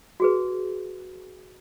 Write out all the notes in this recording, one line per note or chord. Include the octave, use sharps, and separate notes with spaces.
F#4 G#4 B4